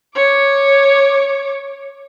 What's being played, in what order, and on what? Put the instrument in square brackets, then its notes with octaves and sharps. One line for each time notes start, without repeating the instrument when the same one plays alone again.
[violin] C#5 D6